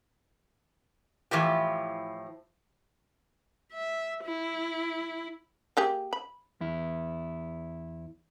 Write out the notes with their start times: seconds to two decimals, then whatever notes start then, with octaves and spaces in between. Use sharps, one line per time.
1.31 A2 E3 F3 G4
3.73 E5
4.24 E4
5.77 A#3 G4 G#4
6.13 B5
6.61 E2 E4